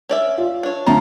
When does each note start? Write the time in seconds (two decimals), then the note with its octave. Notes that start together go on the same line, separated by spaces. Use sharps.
0.09 C#4 D5 E5
0.38 F4
0.63 D4 C#5
0.86 D2 F4 A5 A#5